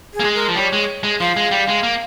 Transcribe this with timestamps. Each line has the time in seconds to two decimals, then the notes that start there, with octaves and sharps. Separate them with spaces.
0.14 G#4
0.20 A#3
0.24 G#3
0.35 A#4
0.48 F3
0.55 G3 C#5
0.73 G#3
1.03 G#3
1.20 F3 F5
1.36 G#3
1.51 G3
1.68 G#3
1.83 A#3